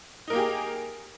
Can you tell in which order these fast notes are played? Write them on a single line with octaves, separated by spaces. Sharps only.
D#4 A#4 A#3 G4 G#4